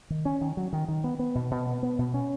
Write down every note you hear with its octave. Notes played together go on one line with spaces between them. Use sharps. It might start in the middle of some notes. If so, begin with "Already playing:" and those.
D#3
C#4
D#3
F#3
D#3
D#3
B3
B3
B2
B2
B3
B3
B2
C#4